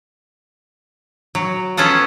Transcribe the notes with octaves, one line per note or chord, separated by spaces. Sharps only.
F#3
B3 C#4 F4 A4 F#5